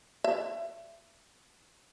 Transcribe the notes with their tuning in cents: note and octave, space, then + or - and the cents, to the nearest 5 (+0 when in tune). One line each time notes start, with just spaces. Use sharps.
E5 +30